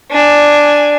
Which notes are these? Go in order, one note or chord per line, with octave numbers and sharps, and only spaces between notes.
D4 G#5